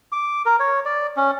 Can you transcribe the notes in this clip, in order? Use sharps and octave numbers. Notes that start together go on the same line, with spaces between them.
D6
A#4
C#5
D5
C#4